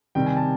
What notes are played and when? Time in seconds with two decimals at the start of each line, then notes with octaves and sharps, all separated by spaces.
0.15 C3 D#3 G3 G5
0.26 G#5
0.37 A5